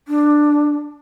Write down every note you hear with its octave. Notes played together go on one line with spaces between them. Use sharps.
D4